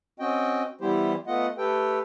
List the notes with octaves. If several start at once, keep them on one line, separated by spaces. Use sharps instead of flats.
C4 C#4 F#4 D#5 G5
E3 G3 B3 E4 G4 C5
A3 B3 F4 D#5 F#5
A3 G4 A4 B4 G5